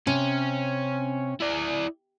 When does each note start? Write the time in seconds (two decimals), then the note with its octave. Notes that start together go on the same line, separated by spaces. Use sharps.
0.07 C3 C#4
1.41 E4 D5